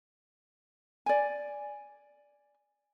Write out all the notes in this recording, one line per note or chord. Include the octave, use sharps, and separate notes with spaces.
D5 G#5